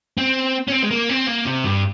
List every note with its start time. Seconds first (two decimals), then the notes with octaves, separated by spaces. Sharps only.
0.17 C4
0.68 C#4
0.72 C4
0.83 G#3
0.90 A#3
1.09 C4
1.27 A#3
1.45 C3
1.64 G2